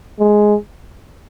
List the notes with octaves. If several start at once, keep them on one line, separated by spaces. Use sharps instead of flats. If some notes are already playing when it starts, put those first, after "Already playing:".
G#3